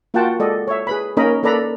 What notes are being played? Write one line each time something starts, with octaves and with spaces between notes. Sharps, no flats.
A#3 F4 F#4 F#5 G5 A5
G#3 A4 D5 D#5
C#5 E5
G#4 B4 B5
A#3 C#4 D#4 A#4 D#5 B5
A#3 A4 B4 D5 A#5 B5